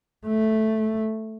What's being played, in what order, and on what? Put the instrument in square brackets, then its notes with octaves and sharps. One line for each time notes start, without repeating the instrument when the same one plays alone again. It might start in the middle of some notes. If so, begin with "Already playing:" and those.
[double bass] A3